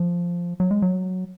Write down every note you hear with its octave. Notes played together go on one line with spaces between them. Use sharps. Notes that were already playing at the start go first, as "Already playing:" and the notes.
Already playing: F3
F#3
G#3
F#3